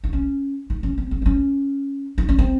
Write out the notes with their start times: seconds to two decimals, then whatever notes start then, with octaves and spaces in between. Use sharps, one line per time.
0.04 D#4
0.13 C#4
0.70 D#4
0.83 C#4
0.98 C4
1.11 C4
1.22 D#4
1.26 C#4
2.18 D#4
2.29 C#4
2.38 C4